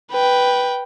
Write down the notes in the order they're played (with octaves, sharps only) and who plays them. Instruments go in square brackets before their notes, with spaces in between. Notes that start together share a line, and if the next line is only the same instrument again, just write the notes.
[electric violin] B4 G5